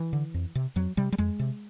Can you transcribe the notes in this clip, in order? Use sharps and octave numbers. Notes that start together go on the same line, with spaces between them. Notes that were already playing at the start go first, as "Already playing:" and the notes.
Already playing: E3
D3
F2
C3
F2 F#3
C3 G3
G3
F2 G#3
C3